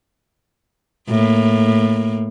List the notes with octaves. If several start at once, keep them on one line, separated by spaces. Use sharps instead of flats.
A2 A#3